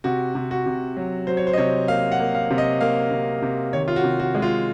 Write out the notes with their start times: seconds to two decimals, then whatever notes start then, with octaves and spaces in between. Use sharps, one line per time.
0.04 C3 F#4
0.35 C3
0.51 F#4
0.66 C3
0.97 F#3
1.27 F#3 C5
1.37 C#5
1.47 C5
1.53 D#5
1.58 C3 C#5
1.88 A#3 F5
2.12 F#5
2.20 A#3
2.35 F5
2.51 C3
2.58 D#5
2.81 A#3 F5
3.11 C3
3.42 C3
3.73 D#3 C#5
3.88 F4
3.96 F#4
4.04 C3
4.20 F#4
4.35 G#3
4.42 F4